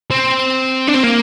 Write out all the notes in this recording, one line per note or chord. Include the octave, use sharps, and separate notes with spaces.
C4
D4
C4
A#3